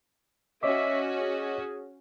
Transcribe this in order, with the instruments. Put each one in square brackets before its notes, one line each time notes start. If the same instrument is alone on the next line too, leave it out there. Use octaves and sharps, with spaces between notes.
[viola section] C#4 F#4 [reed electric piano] C#5 D#5 D6 [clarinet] E5
[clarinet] G#4